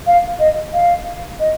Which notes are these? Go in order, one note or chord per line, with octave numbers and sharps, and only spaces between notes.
F5
D#5
F5
D#5